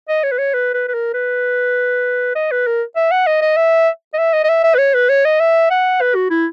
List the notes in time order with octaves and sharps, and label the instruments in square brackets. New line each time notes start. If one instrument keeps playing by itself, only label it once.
[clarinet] D#5
C#5
B4
C#5
B4
B4
B4
A#4
B4
D#5
B4
A#4
E5
F#5
D#5
D#5
E5
D#5
E5
D#5
D#5
E5
E5
B4
C#5
B4
C#5
D#5
E5
F#5
B4
F#4
E4